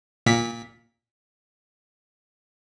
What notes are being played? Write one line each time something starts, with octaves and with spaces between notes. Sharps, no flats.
A#2 B6